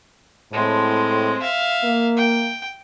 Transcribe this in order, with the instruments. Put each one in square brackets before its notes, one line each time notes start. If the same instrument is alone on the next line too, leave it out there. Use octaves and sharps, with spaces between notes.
[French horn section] A2 [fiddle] G#3 C4
[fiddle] E5 F5
[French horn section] A#3
[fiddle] G5